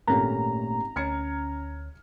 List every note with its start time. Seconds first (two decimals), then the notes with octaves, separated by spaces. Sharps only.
0.07 G#1 A#2 A3 A#3 C#4 G4 A#5
0.96 D2 C#4 F6 G#6 C#7